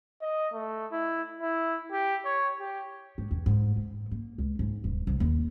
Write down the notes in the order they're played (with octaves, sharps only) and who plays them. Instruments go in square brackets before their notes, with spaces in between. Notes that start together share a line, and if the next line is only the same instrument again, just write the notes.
[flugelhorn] D#5
A3
E4
E4
G4
C#5
G4
[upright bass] G#2
E2
G#2
G#2
A#3
C#2
G#2
D#1
C2
D#2